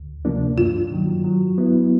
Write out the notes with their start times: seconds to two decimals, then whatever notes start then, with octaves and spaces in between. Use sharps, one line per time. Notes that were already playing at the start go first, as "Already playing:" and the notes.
Already playing: D2
0.25 C3 F3 A#3 D4
0.58 G2 F4
0.92 D#3 F#3
1.25 F#3
1.58 B3 E4